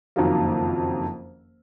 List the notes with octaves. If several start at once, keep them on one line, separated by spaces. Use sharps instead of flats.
F#1 F2 D#3 F#3 A#3